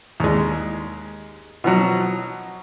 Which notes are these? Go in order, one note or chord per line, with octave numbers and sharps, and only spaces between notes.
D#2 G#3
B2 F3 F#3